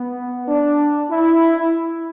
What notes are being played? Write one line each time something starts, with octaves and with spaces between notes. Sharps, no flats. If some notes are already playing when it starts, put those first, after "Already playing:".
Already playing: B3
D4
E4